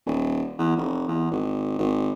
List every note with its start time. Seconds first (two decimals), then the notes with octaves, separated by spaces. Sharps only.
0.06 D#1
0.58 E2
0.77 F1
1.08 E2
1.31 G#1
1.78 G#1